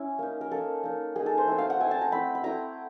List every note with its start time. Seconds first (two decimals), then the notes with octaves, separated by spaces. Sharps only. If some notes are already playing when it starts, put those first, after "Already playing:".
Already playing: C#4 E4
0.19 A#3 D#4
0.41 A#4
0.51 A#3 D#4 A4
0.84 A#3 D#4
1.16 A#3 D#4 G#4
1.26 A4
1.38 C5
1.48 A3 C4 E4
1.58 F5
1.70 F#5
1.80 A3 C4 E4 G#5
1.91 A5
2.01 A#5
2.12 A3 C4 E4 B5
2.35 B5
2.44 A3 C4 E4 A#5